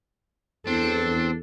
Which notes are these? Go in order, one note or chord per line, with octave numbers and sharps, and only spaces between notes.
E2 C4 D4 A4